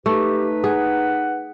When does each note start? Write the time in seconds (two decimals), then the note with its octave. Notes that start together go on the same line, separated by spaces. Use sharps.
0.06 A3 D#4 G4 B4
0.64 G#4 F#5